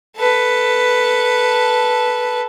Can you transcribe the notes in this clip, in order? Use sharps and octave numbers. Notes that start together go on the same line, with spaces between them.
A4 B4